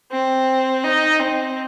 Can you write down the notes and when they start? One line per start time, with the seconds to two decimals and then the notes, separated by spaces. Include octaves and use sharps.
0.11 C4
0.84 D#4
1.19 C4